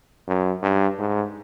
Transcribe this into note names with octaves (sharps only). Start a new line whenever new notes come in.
F#2
G2
G#2